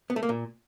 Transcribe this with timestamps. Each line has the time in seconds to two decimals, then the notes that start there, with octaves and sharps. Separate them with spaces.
0.10 B3
0.16 A3
0.23 A#3
0.29 A#2